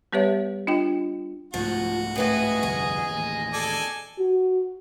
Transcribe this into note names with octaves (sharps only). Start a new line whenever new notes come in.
G3 B3 G4 B4 C#5 E5
D4 F4 D#5 G5
C2 G#2 F3 A3 F#4
A2 G#4 B4 D#5 E5
G1 C2 F2 G#5
A1 D#2
A4 D5 G#5
F#4